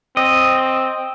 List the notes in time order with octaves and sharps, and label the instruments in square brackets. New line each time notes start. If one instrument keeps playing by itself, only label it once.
[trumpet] C4 [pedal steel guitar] D#5